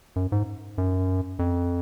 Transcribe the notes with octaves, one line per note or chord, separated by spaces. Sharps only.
F#2
G#2
F#2
F2